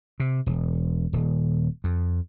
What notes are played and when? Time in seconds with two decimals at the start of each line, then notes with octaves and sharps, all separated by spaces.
0.20 C3
0.46 E1
1.13 D#1
1.84 F2